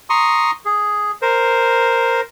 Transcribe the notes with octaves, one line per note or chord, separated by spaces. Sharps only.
A#5 C6 C#6 D#6
G#4
A#4 C5